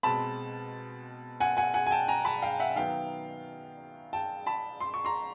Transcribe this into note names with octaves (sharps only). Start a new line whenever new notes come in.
B2 G#3 C4 A5 B5
F#5 G#5
F#5 G#5
F#5 G#5
G#5
G5 A5
G#5 A#5
A5 B5
F5 G5
E5 F#5
D#3 F#3 B3 F5 G5
G5 A5
A5 B5
C6
C#6
A#5 C6